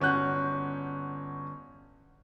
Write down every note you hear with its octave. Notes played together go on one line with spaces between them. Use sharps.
G1 C#4 F#4 F#6 G6